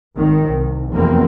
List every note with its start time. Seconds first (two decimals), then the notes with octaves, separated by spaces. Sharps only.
0.17 G#1 D#3
0.49 C2
0.90 F1 E2 F#3 A#3 C4